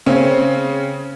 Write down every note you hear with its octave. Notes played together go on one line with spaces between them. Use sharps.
C#3 C4 C#4